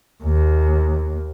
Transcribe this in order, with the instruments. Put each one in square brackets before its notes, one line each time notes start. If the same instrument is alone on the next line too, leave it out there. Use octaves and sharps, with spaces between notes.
[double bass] D#2